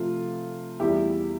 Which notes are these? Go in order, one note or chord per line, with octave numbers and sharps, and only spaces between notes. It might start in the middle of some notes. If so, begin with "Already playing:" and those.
Already playing: C3 F3 A3 C4 F4
E2 E3 G3 E4 G4